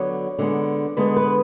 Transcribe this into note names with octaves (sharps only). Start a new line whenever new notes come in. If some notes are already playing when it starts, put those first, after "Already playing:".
Already playing: D3 F#3 B3 C#5
D3 G#3 B3
D3 G#3 B3 B4
B4